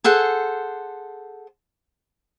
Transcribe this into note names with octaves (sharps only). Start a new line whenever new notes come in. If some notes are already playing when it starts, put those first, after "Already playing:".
G#4 A4 C5 F#5